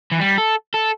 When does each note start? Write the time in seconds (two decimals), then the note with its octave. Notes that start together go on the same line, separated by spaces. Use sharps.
0.12 E3
0.20 G3
0.38 A4
0.74 A4